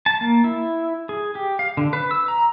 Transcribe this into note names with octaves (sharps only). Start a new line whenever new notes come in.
A5
A#3
E4
G#4
G4
F5
D3
B4
E6
A#5